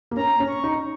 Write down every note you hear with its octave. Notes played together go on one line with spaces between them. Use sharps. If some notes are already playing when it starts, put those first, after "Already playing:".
A#3
C#4 A#5
C#4
C#6
D#4